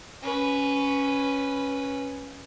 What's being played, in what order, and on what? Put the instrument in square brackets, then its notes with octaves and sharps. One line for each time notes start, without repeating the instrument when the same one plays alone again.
[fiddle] C#4 B4